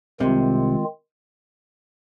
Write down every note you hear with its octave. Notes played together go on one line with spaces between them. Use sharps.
C2 C3 D#3 G#3 C4 F4